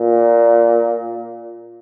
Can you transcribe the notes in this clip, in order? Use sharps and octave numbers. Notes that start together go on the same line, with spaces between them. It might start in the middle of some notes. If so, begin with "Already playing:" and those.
Already playing: A#2